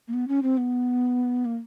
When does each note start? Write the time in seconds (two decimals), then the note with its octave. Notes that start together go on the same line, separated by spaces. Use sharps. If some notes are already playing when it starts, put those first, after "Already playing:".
0.08 A#3
0.14 B3
0.28 C#4
0.43 C4
0.57 B3
1.45 A#3